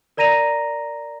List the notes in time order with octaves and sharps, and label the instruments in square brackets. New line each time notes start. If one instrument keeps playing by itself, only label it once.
[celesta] A#4 D5 A#5 A#6 D#7 F7